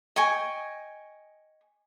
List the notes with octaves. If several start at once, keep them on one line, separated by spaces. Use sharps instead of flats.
D#5 G5 G#5 C#6